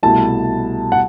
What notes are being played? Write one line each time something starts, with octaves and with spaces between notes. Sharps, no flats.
C2 B2 A3 E4 A5
F#5